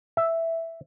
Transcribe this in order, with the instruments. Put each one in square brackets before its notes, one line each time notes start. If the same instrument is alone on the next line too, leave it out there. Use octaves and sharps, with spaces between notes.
[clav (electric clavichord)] E5